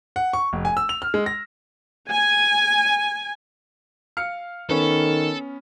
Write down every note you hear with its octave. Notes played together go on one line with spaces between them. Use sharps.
F#5
C#6
F1
G#5
E6
F7
F6
G#3
A#6
G#5
F5 F6 C#7
D#3 B3 C#4 A4